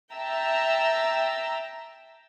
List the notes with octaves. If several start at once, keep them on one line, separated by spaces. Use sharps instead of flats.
E5 G5 A5 A#5 E6